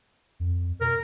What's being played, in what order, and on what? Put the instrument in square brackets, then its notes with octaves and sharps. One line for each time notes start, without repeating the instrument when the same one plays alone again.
[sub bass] F2
[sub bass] B2 [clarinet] A#4